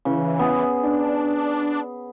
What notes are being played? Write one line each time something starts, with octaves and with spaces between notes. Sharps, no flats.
C#3 E3
B3 G#4
D4